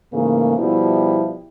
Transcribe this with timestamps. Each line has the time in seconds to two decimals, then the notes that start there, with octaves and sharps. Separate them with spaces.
0.13 G#2 C#3 E3 A3 A#3
0.58 B2 F3 G3 E4